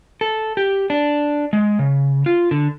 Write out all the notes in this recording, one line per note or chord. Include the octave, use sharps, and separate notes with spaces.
A4
G4
D4
G#3
C#3
F4
D3